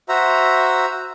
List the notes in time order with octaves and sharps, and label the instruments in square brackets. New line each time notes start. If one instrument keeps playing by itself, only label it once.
[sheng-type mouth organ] F#4 C5 E5 A#5